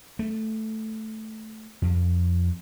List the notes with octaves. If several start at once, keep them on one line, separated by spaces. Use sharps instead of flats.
A3
F2